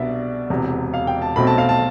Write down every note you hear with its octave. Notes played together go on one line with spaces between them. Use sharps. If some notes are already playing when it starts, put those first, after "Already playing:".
Already playing: C2 B2 B3 D4 D5 E5
E1 E2 C3
F5
G5
A5
B1 B2 A3 C4 B5
A5
F5
A5